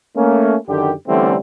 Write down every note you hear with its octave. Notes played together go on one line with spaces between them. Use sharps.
A3 A#3 C#4
F#2 D3 D#3 G4
D3 E3 G3 A3 C4 C#4